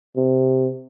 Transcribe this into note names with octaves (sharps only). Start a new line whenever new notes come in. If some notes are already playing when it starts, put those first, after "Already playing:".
C3